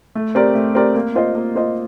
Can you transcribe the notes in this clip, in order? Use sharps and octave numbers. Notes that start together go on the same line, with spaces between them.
A3
C4 G4 A#4 D5
A3
C4 G4 A#4 D5
A#3
F4 C5 D#5
A#3
F4 C5 D#5